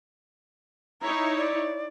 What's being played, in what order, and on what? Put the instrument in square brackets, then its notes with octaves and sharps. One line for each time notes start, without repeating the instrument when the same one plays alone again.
[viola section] D#4 E4 C#5 [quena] A#5
[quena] D5